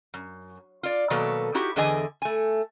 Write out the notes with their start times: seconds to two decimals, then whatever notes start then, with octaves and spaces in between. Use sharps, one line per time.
0.14 F#2
0.83 F4 D5
1.10 B2 D#3 F#3 A#3 A4 B4
1.54 D#4 E4 F#4 G4
1.76 E2 D3 E3 G#4 D#5 G#5
2.22 A3 G#5